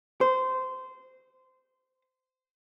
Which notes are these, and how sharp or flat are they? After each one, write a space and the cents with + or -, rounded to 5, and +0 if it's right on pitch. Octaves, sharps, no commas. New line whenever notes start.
C5 -20